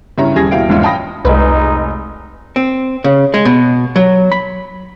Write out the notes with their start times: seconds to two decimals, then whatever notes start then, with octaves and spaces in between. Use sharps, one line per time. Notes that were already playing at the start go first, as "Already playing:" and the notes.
0.18 G2 C#3 E4 C#5 A#5
0.35 D#1 C#3 G3 G#4 G#6 A#6
0.51 D#1 B2 E4 F5 G5 D7
0.69 E1 C#2 G#2 C#4 F4 E5
0.82 F5 G5 A5 B5 D#6 A#6
1.25 F1 C2 G#3 D#4 B4
2.56 C4
3.04 C#3
3.34 G#3
3.45 B2
3.96 F#3
4.32 B5